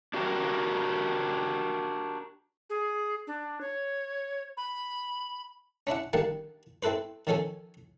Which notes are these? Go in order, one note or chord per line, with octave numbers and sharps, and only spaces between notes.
D4 F#4 G4 A#4
G#4
D4
C#5
B5
C#4 D4 E4 F#5
D3 D#3 G3 A#3 F#5
C4 E4 A4 B4 C5
D#3 F3 C#4 A4 G#5